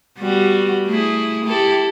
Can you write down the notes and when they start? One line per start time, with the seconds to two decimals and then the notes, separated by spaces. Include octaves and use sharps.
0.19 G3 B3 F#4
0.87 A3 E4 G#4
1.45 E4 G4 A4